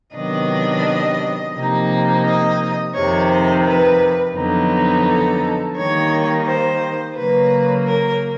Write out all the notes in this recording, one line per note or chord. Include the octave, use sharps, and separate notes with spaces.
C3 D#3 F#3 B3 D4 D#5
C3 F3 A#3 D#4
D#5
F2 C3 D#3 C#5
C5
B4
F2 D3 F#3 B3 D#4
A4
D#3 G3 A#3 D#4 C#5
C5
C#3 F#3 A#3 B4
A#4